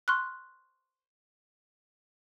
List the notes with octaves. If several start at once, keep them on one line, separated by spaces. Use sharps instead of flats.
C6 C#6 F6 F#6